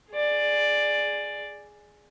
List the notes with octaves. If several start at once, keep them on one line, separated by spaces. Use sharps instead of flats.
G#4 D5